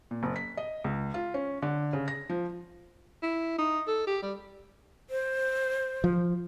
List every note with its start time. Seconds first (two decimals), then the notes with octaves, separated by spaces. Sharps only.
0.11 A#2
0.23 F#1
0.36 B6
0.57 D#5
0.84 C#2
1.14 F4
1.34 C#4
1.63 D3
1.93 C#3
2.08 A#6
2.30 F3
3.23 E4
3.58 D#4
3.88 A4
4.07 G4
4.22 G3
5.10 C5
6.04 F3